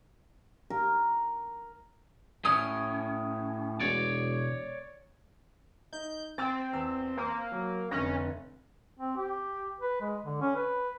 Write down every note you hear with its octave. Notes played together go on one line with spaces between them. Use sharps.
A#4
A2 C#4 D#6
E1 B2 C#5 D5
D#4 G6
C4 G5 A6
E2 E6
A#3 C5
F#3
F1 D3 C#4 A#6
C4
G4
B4
G#3
D3
C#4
B4